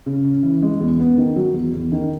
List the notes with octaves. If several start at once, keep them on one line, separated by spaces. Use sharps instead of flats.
C#3
C#4
E3
G#3
E2
B3
D#3
F#3
E2
E2
D#3